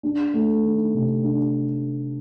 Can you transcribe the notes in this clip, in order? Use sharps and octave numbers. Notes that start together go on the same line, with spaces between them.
D4
A3
D#3
C3
D4